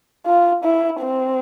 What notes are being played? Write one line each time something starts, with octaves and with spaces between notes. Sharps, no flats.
F4
E4
C4